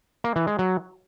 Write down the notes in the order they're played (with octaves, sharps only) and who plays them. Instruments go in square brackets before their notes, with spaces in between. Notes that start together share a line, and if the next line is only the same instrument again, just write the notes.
[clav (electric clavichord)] A#3
E3
G#3
F#3